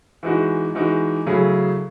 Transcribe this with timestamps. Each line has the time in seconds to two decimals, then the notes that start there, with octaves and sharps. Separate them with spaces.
0.23 E3 G#3 D#4 F#4
0.75 E3 G#3 D#4 F#4
1.27 C#3 F#3 A3 E4 G#4